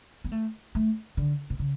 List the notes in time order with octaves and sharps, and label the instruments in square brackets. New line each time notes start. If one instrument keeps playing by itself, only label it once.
[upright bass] B3
A3
A3
D3
B2
C#3